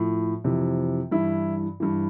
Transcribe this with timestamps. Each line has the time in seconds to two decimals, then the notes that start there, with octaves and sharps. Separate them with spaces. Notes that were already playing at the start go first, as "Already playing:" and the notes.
Already playing: A2 F3
0.44 F2 C3 E3
1.11 G2 E3 E4
1.80 G2 E3